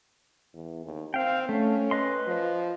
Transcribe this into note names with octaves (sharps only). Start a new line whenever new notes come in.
E2
D#2
C4 F5 G5
A3 C#4
B4 D#5 C6
F3